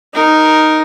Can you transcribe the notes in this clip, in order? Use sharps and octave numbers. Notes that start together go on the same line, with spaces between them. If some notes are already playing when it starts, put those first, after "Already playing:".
D#4 A#4